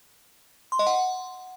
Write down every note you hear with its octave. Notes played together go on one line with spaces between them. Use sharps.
C6
D#5
F#5